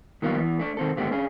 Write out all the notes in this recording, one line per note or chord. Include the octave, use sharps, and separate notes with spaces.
D#3 F#3 G3 A#3 B3 F4
E2 E3 B3
A3 D4
D#3 C4 A4
D#2 G#2 D3 A3 B3 G4
C#4 D4 G#4